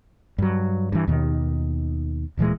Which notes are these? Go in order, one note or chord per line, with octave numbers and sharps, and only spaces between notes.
G2 F#3
G2 E3
D#2 B2 D#3
D1 A#2 E3 G#3